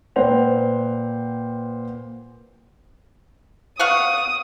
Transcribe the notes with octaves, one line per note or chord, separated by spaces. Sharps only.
A#2 B4 C5 F#5 G5 F7
F5 F#5 C#6 D#6